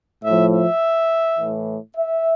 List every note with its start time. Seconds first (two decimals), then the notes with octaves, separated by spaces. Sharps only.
0.23 A2 F3 E5
0.52 E5
1.37 A2 E3
1.96 E5